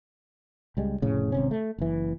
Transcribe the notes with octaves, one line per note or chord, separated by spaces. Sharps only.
C#2 G3 G#3
F1 A2 C#3
G#1 C3 C#4
A3
F#1 E3